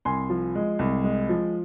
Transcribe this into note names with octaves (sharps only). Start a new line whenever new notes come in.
C2 G#5 C6
F3
G#3
C2
G#3
F3